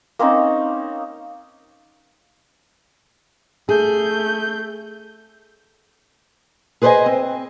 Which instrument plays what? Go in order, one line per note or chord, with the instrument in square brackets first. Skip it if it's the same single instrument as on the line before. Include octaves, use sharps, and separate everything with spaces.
[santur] A#3 C4 C#4 D#4
[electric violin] A3 G6 [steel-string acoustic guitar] G#4
[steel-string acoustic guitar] G#4 B4 C5 D5 D#5 G#5
C4